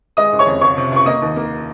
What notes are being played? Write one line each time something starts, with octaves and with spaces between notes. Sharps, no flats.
G#3 D#5 D#6
F#1
C#5 C#6
F2
C#2 C#5 C#6
C3
C#2 C#6
A#3 D#5 D#6
D#2
A#3